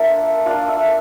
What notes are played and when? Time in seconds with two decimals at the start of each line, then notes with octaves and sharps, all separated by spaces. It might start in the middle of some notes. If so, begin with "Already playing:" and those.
Already playing: A#3 D4 F4 E5
0.46 A#3 D4 F4 F5
0.68 E5